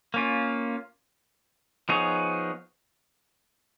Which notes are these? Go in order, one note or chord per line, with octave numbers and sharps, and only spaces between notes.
A#3 C#4 F4
F3 B3 D#4 G#4 C#5